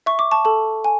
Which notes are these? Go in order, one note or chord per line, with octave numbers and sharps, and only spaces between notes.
E5 C#6
D6
A5 C#6
A4 A5
G#5